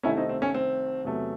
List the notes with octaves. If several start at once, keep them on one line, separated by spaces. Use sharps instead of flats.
C2 C3 D#3 A3 C#4 E4
C4 D#4
C4
C#4
C4
E2 C3 F#3 A3